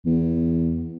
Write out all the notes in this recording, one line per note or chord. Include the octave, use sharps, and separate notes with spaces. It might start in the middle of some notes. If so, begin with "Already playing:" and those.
E2